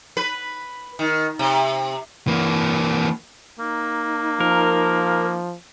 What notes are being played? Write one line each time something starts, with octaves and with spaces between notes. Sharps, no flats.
B4
D#3
C3
E3 A#3
A#3 D#4
F3 A#4